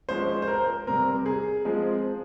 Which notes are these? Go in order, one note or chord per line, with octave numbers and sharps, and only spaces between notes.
F3 G#3 C#4 C5
C5
A#4
C3 G3 C4 A#4
G#4
F3 G#3 C4